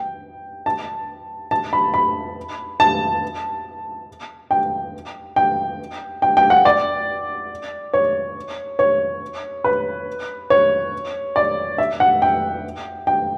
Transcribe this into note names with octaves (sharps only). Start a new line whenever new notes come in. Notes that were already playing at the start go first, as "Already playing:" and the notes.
Already playing: G5
A5
A5
B5
B5
A5
G5
G5
G5
G5
F#5
D5
C#5
C#5
B4
C#5
D5
E5
F#5
G5
G5